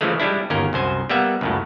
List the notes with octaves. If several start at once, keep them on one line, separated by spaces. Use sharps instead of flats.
C#3 E3 F3 G#3 A3
G3 G#3 D4 E4
G1 D#2 C#4 A#4
C2 F#2 C5 G#5
G3 A#3 B3 E5 F#5
C#2 F#2 A2